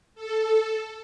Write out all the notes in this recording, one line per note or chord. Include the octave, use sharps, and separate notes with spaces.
A4